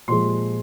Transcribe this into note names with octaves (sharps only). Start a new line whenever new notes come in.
A#2 F3 G#3 C6